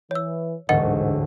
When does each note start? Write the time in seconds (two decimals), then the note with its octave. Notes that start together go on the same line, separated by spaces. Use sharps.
0.11 E3 C#5 E6
0.69 E1 A1 D2 G#2 A#4 D#5 F#5